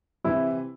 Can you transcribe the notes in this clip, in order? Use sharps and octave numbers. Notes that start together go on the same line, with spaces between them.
C3 E3 E4